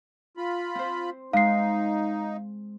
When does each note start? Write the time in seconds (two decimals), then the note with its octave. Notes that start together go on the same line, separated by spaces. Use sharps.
0.37 F4 B5
0.75 C4 C5
1.33 G#3 D#4 F5 C7